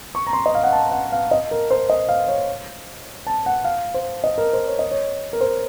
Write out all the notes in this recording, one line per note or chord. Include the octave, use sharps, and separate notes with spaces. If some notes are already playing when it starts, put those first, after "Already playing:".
C#6
A#5
C6
D#5
F5
F#5
A5
F#5
F5
D#5
A#4
C5
D#5
F5
C#5
A5
F#5
F5
C5
D#5
A#4
C5
C#5
D#5
C#5
A#4
C5